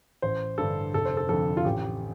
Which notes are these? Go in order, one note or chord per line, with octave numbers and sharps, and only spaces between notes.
A1 C5
G2 D3 A4
F1 A4
C5
A4
F2 D3 A4
F4
A1 G4